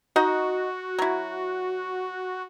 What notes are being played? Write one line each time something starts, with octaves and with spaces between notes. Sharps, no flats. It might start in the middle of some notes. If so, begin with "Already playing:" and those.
D#4 F#4 D#5
F#3 E4